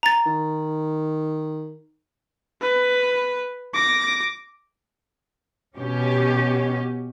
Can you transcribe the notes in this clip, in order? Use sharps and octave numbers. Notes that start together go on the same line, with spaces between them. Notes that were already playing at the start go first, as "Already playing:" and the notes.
A#5 A6
D#3
B4
D6 A#6
B2 C#4 G4